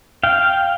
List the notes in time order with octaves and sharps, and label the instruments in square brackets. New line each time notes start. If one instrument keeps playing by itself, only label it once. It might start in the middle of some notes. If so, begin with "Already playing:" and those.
[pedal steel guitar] F5 G5